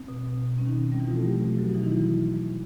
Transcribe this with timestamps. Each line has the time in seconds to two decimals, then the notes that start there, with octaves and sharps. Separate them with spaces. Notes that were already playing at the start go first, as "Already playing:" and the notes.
Already playing: C4
0.08 B2
0.24 B2
0.41 B2
0.58 G3 C#4
0.66 D#3 D#4
0.75 B2 C#4
0.84 C4
0.92 G3 C#4
1.00 E3 E4
1.08 B2 F3 F4
1.16 A3 A4
1.25 F#3 G3 G4
1.42 B2
1.58 F#3 F#4
1.75 B2 E3 E4
1.83 D#3 D#4
1.92 E3 F#3 E4